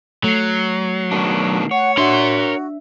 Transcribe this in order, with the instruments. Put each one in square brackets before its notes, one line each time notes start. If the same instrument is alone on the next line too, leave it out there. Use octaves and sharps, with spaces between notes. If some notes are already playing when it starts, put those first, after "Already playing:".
[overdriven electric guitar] F#3 [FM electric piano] A3 C7
[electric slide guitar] B2 D#3 D4
[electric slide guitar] C#5 [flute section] F#5
[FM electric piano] D4 E5 [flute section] F#4 [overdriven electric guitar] A#4 C6